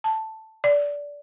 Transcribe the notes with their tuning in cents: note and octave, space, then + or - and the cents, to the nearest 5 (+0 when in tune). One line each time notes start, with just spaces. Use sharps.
A5 +0
D5 -15